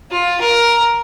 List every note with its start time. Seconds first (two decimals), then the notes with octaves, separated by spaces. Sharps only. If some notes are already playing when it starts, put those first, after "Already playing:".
0.11 F4
0.40 A#4